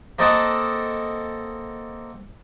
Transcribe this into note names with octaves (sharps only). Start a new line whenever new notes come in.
A#3 C4 A4 D#5 F#5